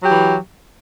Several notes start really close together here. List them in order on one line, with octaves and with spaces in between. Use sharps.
F#3 G4 E3